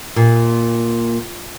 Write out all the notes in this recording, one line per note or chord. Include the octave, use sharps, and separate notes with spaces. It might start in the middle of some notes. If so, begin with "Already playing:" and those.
A#2